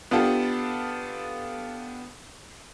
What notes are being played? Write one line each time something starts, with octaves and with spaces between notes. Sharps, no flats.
B3 D4 F4 G4 A4